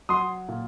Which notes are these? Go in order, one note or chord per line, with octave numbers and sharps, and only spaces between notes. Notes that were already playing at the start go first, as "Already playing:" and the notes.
F#3 C6 D#6
A#2